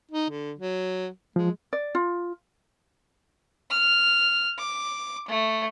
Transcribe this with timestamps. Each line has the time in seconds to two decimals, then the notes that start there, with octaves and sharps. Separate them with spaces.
0.11 D#4
0.30 D3
0.59 F#3
1.36 F3 G#3
1.73 D5
1.95 F4
3.71 F6
4.59 D6
5.28 A3